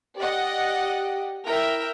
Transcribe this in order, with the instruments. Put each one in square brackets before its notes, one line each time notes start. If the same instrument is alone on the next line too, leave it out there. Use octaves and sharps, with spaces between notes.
[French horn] G4 [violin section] D5 D#5 F#5
[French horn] E4 [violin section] A#4 E5 G5